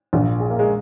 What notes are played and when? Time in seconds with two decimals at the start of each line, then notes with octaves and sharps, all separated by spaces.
0.13 A#1 A#2
0.40 G#4
0.50 A#3
0.59 G#3